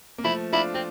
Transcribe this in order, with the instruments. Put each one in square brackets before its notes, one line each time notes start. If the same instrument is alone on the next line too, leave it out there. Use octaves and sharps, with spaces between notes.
[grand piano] A#3
[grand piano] F3 A3 [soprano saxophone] E4
[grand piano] D4 F4 [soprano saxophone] E4
[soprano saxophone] C4 [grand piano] F4